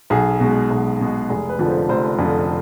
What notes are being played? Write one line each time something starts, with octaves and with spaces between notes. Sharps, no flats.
B1 G#4
B2 G#3
B1
B2 G#3
F1 G#4
B4
F2 D3 F3
C5
F1 C5
F2 D3 F3